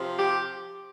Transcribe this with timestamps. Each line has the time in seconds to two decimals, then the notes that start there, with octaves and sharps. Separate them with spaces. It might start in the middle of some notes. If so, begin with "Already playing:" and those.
Already playing: C3 F3 C4
0.16 G4